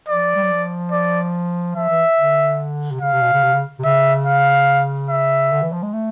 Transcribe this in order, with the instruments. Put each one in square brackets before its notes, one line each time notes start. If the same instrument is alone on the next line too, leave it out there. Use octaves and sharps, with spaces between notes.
[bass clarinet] F3 [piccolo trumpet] D5
[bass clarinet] G3
F#3
F3
[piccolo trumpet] D5
[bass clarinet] F3 [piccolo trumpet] E5
[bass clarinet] E3
D3
C3
[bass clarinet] C#3 [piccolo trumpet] F5
[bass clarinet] C3
B2
C#3
C3
C#3
C3
[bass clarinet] C#3 [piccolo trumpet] E5
[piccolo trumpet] F5
E5
[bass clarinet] D3
E3
F3
G#3
A3